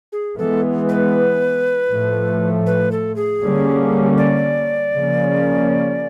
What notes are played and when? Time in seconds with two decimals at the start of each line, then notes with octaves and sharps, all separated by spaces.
0.12 G#4
0.37 E3 G#3 B3 A4
0.89 B4
1.90 A2 F3 A3
2.66 B4
2.92 A4
3.16 G#4
3.42 D3 G3 A#3 C#4
4.18 D5
4.94 C#3 F3 A#3 C#4